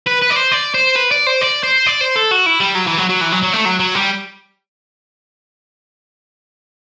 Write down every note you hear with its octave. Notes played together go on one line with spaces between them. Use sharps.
B4
B4
D5
C5
D5
C5
B4
D5
C5
D5
C5
D5
C5
A4
F#4
E4
G3
F#3
E3
F#3
F#3
E3
F#3
F#3
A3
F#3
F#3
G3